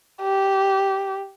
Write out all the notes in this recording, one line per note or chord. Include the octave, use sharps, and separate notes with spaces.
G4